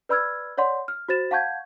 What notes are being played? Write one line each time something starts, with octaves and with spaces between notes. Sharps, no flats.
B4 D5 B5 E6 F6 G#6
C#5 D5 F#5 C6
F6
F#4 C5 A6 E7
F5 F#5 A5 C#6 G6 G#6